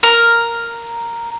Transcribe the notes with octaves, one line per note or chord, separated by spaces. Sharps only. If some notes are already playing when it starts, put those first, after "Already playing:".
A#4